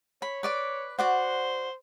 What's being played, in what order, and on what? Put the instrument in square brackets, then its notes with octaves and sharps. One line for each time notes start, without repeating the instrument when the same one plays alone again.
[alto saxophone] C#5 [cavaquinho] B5
[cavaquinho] B4 D5 D6
[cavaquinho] F#4 D5 F#5 [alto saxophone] C5